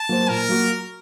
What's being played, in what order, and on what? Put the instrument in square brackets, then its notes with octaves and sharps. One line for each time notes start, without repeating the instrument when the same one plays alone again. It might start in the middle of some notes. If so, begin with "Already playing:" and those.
Already playing: [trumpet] A5
[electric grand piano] F#3 A#3 F#4 C5
[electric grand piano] A#2 [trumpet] A#4
[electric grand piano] F#3 A#3 F#4